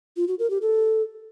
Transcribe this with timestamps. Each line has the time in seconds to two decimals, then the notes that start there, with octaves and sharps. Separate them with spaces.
0.17 F4
0.28 F#4
0.39 A#4
0.50 G4
0.61 A4